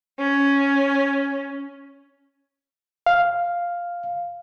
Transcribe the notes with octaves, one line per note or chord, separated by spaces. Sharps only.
C#4
F5